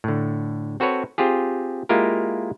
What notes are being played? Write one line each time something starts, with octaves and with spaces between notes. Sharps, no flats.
A2 D3
C4 F#4 A4 B4 C#5
C4 F4 G4 G#4
G#3 A#3 E4 F4 G4 A#4